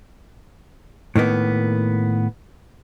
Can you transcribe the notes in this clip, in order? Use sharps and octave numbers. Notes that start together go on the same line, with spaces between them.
A2 D#3 A#3 B3